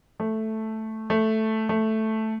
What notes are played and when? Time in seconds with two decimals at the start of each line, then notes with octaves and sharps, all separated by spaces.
0.20 A3
1.10 A3
1.69 A3